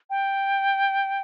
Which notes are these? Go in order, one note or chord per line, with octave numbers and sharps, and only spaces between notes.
G5